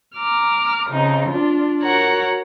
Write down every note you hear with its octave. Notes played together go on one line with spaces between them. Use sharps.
A#5 D6 F6
F2 C#3 D#4
D4 F4
F#4 A#4 C#5 F#5 A#5